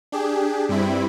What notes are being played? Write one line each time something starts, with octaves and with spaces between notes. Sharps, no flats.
D4 G4 G#4
G2 G3 C4 E4 B5